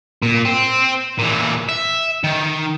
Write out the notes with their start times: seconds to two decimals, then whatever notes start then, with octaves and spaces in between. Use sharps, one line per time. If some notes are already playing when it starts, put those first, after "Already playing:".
0.23 A#2
0.45 C4
1.19 A#2 E3
1.69 E5
2.24 D#3